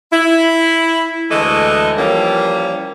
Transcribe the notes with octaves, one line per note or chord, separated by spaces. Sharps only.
E4
D2 E3 G#3 A3 A4 D#5
E3 F3 G3 A#3 C#4